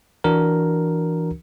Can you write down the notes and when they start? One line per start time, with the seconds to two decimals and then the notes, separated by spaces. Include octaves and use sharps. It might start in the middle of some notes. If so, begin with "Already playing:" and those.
0.24 E3 D4 F#4 A#4